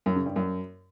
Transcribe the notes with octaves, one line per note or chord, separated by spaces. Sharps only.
F#2
C#3
G2
F#2